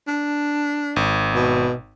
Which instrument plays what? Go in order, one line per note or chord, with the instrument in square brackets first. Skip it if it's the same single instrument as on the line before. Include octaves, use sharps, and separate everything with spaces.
[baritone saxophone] D4
[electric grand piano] G#1
[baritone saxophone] B2